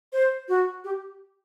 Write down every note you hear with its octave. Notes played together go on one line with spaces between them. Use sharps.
C5
F#4
G4